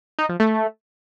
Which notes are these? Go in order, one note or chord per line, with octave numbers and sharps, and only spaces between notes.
D#4
F3
A3